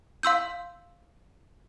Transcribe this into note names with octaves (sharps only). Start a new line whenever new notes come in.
F5 C6 E6 G6